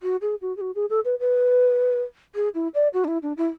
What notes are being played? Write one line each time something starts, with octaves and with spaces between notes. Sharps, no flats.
F#4
G#4
F#4
G#4
F#4
G#4
A4
B4
B4
G#4
E4
D5
F#4
D4
E4
D4
E4